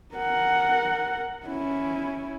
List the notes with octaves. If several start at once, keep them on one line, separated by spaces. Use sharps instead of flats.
A#4 F#5
C#4 E4